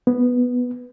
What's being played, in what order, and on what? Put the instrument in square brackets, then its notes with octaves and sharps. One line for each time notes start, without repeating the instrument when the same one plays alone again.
[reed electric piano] B3